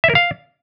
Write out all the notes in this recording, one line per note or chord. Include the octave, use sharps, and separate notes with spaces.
E5
A#4
F5